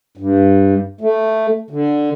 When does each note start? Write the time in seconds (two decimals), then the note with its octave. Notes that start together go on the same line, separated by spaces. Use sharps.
0.17 G2
1.01 A3
1.70 D3